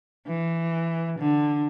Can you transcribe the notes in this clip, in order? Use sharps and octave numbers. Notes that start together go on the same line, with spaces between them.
E3
D3